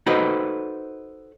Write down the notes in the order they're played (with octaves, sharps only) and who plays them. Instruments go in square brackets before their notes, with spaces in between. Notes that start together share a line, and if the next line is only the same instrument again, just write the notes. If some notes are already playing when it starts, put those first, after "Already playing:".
[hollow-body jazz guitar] D#4 F#4 A4 B4 C5 D#5